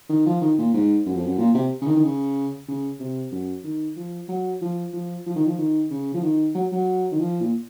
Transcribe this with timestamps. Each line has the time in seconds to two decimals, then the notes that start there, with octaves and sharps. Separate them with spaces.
0.10 D#3
0.26 F3
0.41 D#3
0.58 A#2
0.74 G#2
1.06 F#2
1.16 F2
1.26 F#2
1.38 A#2
1.55 C3
1.81 C#3
1.86 D#3
1.96 D#3
2.03 C#3
2.68 C#3
3.00 C3
3.32 F#2
3.64 D#3
3.96 F3
4.28 F#3
4.61 F3
4.93 F3
5.26 F3
5.36 D#3
5.46 F3
5.58 D#3
5.91 C#3
6.14 F3
6.23 D#3
6.55 F#3
6.72 F#3
7.12 D#3
7.19 F3
7.41 A#2